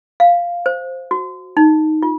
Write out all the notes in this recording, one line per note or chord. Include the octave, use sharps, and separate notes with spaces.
F5
C5
F#4
D#4
F4